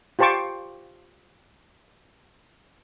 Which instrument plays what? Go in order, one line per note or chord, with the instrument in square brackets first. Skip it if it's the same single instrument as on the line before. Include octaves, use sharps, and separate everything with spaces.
[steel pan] F4 G4 C5 A5 C#6 D6